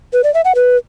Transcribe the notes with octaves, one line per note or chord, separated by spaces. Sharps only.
B4
D5
E5
F#5
B4